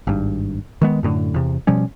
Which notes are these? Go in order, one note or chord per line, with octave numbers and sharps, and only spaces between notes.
G#1 G2
D#3 G#3 B3
F#2 A2 D3
E2 C3
B2 F3 G3 C#4